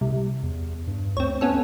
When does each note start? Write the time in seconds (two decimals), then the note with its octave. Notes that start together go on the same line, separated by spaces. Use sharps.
0.01 C2
0.43 E2
0.87 G2
1.17 D2 C4 C#5
1.41 B3 C#4 A4